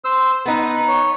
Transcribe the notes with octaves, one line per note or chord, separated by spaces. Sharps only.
C5 E6
B3 D#4 B4
C#5